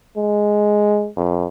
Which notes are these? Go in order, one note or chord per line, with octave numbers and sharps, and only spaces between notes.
G#3
F2